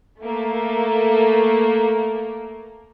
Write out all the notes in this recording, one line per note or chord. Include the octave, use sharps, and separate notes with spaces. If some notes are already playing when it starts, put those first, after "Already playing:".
A3 A#3